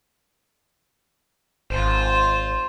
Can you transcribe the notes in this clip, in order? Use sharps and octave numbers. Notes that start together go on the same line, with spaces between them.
G#1 F4 C5